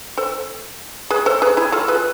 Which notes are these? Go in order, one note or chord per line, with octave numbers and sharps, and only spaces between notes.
A4 C5
G#4 B4
A4 C5
G#4 B4
E4 G#4
F4 A4
G#4 B4